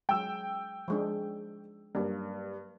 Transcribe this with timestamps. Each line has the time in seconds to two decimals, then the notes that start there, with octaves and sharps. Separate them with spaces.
0.09 F#3 G#3 G5 E6
0.88 F3 G#3 D4
1.95 G2 F#3 A#3